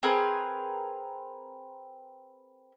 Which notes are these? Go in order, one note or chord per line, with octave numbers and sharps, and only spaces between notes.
C4 G#4 A#4 B4